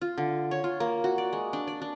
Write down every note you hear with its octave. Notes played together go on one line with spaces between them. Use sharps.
F4
D3
C#5
F4
A#3
F#4
D5
G#3
D4
D5
D4